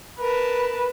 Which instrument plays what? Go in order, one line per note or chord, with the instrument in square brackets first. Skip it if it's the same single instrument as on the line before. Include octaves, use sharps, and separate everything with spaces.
[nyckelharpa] A#4 A5 [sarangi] B4